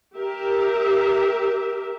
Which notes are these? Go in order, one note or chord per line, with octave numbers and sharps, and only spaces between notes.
G4 A#4 E5